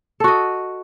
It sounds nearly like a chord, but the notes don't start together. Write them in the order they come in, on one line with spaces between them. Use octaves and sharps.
A4 F#4 D#5